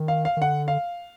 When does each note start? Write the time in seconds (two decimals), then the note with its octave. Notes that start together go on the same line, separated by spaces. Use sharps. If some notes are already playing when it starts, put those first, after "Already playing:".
Already playing: D#3
0.08 F5
0.25 F5
0.37 D#3
0.42 D3 F#5
0.68 F5